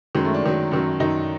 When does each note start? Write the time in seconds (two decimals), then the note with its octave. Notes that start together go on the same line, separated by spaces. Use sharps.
0.15 F#2 D#3 F#3 G#3
0.24 A3
0.34 D4
0.44 F#2 D#3 F#3
0.72 F#2 D#3 F#3
1.00 F#2 D#3 F#3 D#4